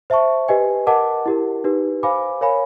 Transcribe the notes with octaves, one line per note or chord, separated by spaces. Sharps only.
C5 E5 A5 C#6
G4 B4 D#5 G#5
A#4 D#5 F#5 A5 D6
E4 G4 A#4
D#4 G4 B4
C5 F5 G#5 B5 D6
A#4 C#5 F5 G#5 B5